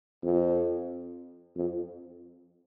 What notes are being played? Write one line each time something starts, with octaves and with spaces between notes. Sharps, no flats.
F2
F2